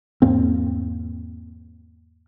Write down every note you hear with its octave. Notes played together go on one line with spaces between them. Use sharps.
E2 G#2 A#3 C4